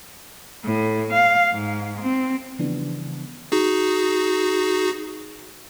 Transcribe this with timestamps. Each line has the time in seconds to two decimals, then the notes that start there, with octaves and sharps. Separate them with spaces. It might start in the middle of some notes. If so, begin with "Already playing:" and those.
0.64 A2
1.13 F5
1.53 G#2
2.02 C4
2.59 C#3 E3 F3 G3 B3 D4
3.52 D#4 F#4 G#4